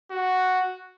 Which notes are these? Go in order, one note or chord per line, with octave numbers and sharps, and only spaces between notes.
F#4